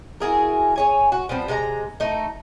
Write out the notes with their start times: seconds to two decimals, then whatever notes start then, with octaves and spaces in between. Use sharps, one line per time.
0.20 E4 F#4 G#4 A#4
0.76 G#4 C#5 G#5
1.12 F#4
1.29 F3 G3 B3 C4
1.48 C3 G#3 A#4 A#5
2.00 A3 D#4